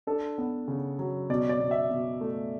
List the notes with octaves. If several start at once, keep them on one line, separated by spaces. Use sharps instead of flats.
D4 A4
B3
C#3
F#3
B2 D5
D5
B2
E5
B2
A3